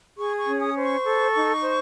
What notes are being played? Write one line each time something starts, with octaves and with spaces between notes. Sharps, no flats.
G#4 C#6
C#6
C#4
D#6
C5
C#6
A4
D#4
C5